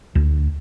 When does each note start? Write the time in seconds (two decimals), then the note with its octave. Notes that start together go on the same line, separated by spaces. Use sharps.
0.15 D2